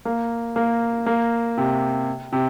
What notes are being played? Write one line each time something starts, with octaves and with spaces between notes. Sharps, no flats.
A#3
A#3
A#3
C3
C3